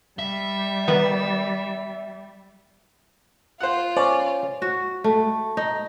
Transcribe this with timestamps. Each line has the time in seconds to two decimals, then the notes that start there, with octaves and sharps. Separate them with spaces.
0.19 G3 E5
0.88 D#3 B3
3.60 F4 C5 F#5
3.97 C#4 C5 D5
4.62 F#4
5.04 A3
5.57 D#4